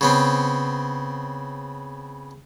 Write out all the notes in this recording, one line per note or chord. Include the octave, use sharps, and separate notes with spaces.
C#3 B3 C4